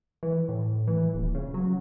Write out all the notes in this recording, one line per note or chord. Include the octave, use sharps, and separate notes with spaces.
E3
A2
E3
D#1
C#3
F#3